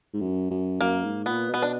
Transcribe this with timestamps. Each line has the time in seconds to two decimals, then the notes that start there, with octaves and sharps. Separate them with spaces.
0.13 G#2
0.20 F#2
0.50 F#2
0.81 F#2 A#3
1.04 G#2
1.26 A#2 B3
1.48 B2
1.54 B3
1.62 D4